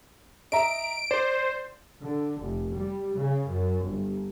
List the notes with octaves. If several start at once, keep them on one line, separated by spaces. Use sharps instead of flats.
D#5 E5 A#5 D7
C5 D5
D3
F1
G3
C#3
F#2
G1